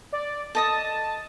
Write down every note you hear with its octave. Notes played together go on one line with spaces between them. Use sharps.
D5
A4 D#5 A5 D#6